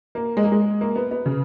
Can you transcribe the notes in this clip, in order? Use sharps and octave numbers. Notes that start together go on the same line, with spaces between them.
A#3
G#3
A#3
G#3
A#3
B3
B3
C#3